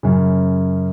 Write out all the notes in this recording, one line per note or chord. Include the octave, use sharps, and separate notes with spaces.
F#2 C#3